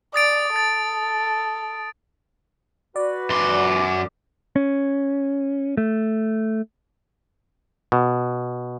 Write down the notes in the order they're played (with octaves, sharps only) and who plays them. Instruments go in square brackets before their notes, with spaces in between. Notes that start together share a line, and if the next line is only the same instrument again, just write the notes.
[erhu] D5 [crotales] D#6 A6 D7
[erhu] A4 [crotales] A6
[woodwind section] F#4 B4 [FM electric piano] D5
[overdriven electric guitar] F#2 C6 [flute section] D6
[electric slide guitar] C#4
A3
[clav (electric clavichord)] B2